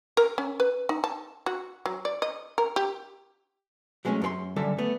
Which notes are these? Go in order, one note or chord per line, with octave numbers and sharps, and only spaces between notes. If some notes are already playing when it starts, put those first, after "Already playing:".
A#4
C#4
B4
D#4
A5
F#4
F#3
D5
D#5
A#4
G4
F#3 G#3 A3 C4 C#4
F#2 A4 C6
F#2 D3 G3 A4 E5
A3 B3